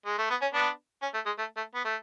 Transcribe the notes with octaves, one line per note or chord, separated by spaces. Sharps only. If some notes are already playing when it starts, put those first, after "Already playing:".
G#3
A3
B3
C#4
B3 D4
C#4
A3
G#3
A3
A3
B3
A3